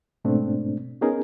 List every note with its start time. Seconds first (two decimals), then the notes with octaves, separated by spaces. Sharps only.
0.25 G#2 B2 A3 C4 D4
1.01 B3 C#4 D#4 G#4 A#4